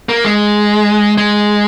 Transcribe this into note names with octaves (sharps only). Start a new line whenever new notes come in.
A#3
G#3
G#3